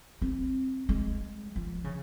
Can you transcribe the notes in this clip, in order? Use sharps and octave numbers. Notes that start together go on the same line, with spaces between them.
C4
G#3
F3
C#3